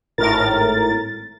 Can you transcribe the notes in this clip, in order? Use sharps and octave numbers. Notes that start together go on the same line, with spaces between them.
G#1 A2 A#4 A6